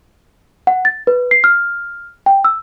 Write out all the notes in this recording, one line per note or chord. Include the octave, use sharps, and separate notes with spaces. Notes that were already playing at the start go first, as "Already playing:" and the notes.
F#5
A6
B4
C7
F6
G5
E6